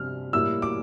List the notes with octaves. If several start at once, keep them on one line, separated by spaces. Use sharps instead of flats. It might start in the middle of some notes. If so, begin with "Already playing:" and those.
Already playing: C3 G3 D4 F6
A2 G3 A#3 E4 E6
D6